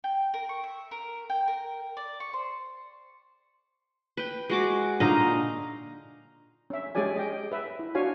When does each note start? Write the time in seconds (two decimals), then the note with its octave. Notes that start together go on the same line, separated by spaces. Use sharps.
0.04 G5
0.34 A#4
0.49 C#6
0.64 E5
0.91 A#4
1.30 G5
1.48 A#4
1.97 D5
2.20 C#6
2.33 C5
4.17 B4 G5
4.50 G#3 F#4 D6
5.00 A#2 D3 D#4 D#5 F5 A#5
6.70 C#4 E5
6.95 G#3 C#4 G4 G#4 D5 G#5
7.16 D#5 G5
7.52 B4 E5
7.79 E4
7.95 D4 F#4 C#5 F5 G#5